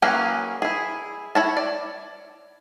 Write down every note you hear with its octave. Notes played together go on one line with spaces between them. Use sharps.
E3 F#3 A#3 C#4 G#4
E4 G#4
E4 C#5 A5
D5